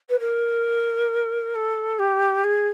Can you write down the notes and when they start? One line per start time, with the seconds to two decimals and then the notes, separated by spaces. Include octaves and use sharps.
0.09 B4
0.19 A#4
1.55 A4
1.99 G4
2.43 G#4